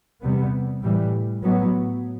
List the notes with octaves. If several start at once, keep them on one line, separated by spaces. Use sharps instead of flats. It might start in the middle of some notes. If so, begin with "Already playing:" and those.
E2 C3 G3 B3
A2 E3 G3
A2 F#3 B3